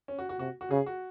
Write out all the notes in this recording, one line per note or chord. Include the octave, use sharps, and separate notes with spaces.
C#4
F#4
F#4
C3 F#4
F#4
C#3 G#4
F#4